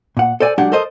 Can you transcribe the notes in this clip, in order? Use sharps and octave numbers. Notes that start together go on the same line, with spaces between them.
A#2 F#5
A4 C5 D5 G#5
F#3 G#3 D4 G4 G#4 F#5
A4 A#4 C5 D#5